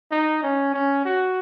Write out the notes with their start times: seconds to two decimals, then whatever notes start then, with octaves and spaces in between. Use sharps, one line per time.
0.11 D#4
0.43 C#4
0.74 C#4
1.05 F#4